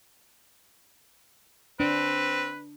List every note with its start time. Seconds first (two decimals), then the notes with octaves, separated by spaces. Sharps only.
1.80 C4 D4 B4